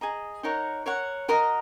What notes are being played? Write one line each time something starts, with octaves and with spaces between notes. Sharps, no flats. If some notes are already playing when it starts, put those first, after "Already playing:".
G#4 D#5 A#5
D#4 A#4 C#5 F#5
A#4 C#5 F#5
F#4 A#4 D#5 A#5